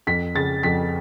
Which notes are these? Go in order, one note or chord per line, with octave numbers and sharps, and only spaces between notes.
F2 B6
C#3 A6
F2 B6